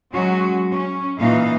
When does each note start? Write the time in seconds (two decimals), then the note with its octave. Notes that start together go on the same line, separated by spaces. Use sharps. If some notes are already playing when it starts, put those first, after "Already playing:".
0.13 F#3 G#3 C#4 F#4
0.71 C#4
1.19 A#2 E3 D#4 F5